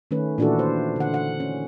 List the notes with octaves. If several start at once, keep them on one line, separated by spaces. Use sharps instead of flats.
D#3 A3 C#4 B4
A#2 E3 D4 E4 F#4 A4
C5
D3 F#5
F#5
C#4